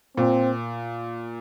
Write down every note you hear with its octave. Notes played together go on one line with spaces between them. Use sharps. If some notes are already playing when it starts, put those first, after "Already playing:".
A#2 C4